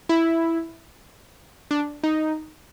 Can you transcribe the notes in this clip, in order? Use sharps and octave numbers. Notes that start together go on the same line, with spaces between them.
E4
D4
D#4